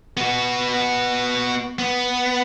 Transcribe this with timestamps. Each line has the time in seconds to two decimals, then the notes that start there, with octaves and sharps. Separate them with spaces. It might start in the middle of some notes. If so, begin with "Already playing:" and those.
0.17 B3 F#4
1.79 B3